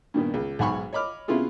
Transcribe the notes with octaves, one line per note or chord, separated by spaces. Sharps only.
G2 A#2 D#3 B3
C#2
B1 G#2 F#5 G#5 B5 C#6
C#5 D#5 B5 D6 F6
C3 B3 C#4 E4 F4 G#4